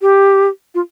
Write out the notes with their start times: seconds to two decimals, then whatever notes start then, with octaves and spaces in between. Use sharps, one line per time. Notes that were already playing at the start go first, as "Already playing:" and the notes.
0.01 G4
0.74 F4